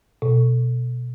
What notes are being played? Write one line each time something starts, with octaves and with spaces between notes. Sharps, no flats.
B2